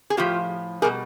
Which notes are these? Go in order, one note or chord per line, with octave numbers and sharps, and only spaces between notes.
G#4
A2 F3 F4 G4
B2 G3 G#4 A#4